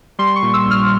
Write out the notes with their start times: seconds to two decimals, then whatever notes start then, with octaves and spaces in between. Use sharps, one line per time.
0.19 G3 C6
0.36 C#6
0.42 A#2
0.54 E6
0.65 A#1
0.71 F6